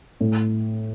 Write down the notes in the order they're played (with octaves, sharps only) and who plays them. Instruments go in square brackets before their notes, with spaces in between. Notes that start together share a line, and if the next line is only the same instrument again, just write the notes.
[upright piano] A2